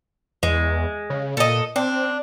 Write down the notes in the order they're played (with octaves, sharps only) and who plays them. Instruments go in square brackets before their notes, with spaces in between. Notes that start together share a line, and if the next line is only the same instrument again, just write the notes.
[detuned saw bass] E2 [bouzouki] G#3
[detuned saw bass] C#3
[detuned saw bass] A#2 [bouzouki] A4 D#5
[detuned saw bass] C4 [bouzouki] D4